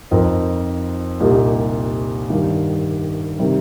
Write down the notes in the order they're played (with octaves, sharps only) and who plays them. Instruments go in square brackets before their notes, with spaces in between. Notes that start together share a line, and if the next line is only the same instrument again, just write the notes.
[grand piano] F2 F3 D#4 A#4
C2 A#2 A#3 D#4 G4
G2 D#3 G3
C3 D#3 G3